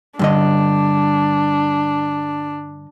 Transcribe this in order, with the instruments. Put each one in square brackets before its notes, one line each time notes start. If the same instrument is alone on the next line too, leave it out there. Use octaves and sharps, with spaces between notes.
[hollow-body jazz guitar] G2 D3 D#5 [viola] D4